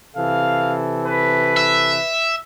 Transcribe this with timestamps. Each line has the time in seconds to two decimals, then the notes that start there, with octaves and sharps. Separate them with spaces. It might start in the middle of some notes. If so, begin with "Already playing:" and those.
0.16 C3 E3 A4 F5
1.05 B4
1.57 E5